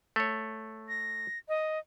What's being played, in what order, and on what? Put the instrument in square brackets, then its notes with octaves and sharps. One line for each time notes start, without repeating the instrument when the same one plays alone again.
[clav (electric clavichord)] A3 C#5
[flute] A#6
D#5